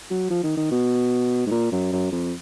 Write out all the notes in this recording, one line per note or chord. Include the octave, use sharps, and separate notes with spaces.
F#3
F3
D#3
D#3
B2
G#2
A#2
F#2
F#2
F2